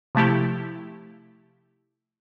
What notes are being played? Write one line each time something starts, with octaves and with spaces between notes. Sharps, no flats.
C3 F3 A3 E4 G4